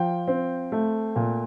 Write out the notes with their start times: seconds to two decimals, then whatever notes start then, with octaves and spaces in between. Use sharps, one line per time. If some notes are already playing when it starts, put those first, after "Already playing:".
Already playing: F3 G5
0.27 C4
0.72 A3
1.16 A#2